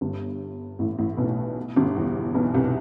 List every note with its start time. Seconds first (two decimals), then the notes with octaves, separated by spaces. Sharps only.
0.01 G1 G2
0.79 A1 A2
0.99 A1 A2
1.17 B1 B2
1.76 G1 G2
1.96 E2
2.35 B1 B2
2.54 C2 C3